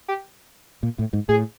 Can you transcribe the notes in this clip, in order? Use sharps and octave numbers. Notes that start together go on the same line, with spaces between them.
G4
A#2
A2
G#2
A2 G#4